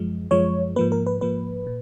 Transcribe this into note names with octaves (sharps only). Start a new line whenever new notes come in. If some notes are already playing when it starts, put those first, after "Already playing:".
Already playing: F#2 F3 G#3
F#2 F3 G#3 C#5
G#2 F3 A#3 B4
A#4
B4
G#2 F3 A#3 B4
A#2